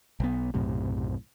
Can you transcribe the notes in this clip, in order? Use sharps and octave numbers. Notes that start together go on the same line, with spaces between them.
B1 B3
B1 F#2 A2 C3